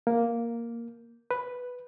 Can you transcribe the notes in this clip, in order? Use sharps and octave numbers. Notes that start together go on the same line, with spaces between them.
A#3
B4